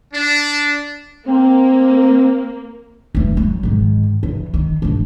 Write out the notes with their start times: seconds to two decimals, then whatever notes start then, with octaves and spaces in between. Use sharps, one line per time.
0.13 D4
1.26 A#3 C4
3.15 D1 E2
3.37 F#3
3.63 G#2 D#3
4.23 E2
4.54 D#3
4.82 G#1 D4